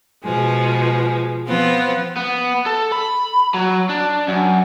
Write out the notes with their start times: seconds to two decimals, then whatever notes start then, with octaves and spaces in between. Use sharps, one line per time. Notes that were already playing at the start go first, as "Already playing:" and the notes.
0.22 B2 F3 G#3
1.47 F3 B3 C4 F4
2.17 B3
2.66 A4
2.92 B5
3.54 F#3
3.89 D4
4.28 F#2